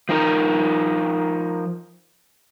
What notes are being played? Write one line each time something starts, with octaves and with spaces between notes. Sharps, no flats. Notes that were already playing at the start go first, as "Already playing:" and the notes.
F3 D#4 A#4